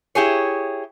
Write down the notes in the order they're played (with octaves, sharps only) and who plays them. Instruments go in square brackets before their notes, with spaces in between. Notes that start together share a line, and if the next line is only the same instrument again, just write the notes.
[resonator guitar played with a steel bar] E4 G4 G#4 C#5